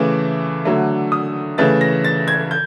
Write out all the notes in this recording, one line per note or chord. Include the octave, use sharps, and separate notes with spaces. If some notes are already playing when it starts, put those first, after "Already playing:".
Already playing: C#3 E3 A3 D6
D3 F#3 A3
D#6
C#3 E3 A3 A6
A#6
A6
G#6
G6